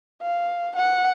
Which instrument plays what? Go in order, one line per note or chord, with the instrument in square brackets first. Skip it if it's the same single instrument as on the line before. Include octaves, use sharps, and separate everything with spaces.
[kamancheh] F5
F#5